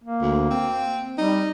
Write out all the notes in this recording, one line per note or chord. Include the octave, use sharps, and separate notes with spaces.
A#3
D2
C4
G3 D#4